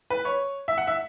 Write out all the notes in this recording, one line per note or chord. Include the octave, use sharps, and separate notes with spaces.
B4
C#5
E5
F#5
E5